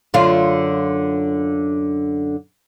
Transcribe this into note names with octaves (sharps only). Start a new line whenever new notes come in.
F#2 D3 F4